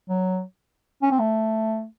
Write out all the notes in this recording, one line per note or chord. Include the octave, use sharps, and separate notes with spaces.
F#3
C#4
C4
A3